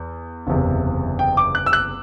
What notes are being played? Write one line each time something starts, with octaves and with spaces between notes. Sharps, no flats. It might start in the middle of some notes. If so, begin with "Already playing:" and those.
Already playing: E2
F#1 E2 C3
G5
D6
F#6
E6
F#6